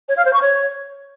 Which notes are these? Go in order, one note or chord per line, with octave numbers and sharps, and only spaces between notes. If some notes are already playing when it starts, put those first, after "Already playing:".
C#5
F5
C5
C#6
C#5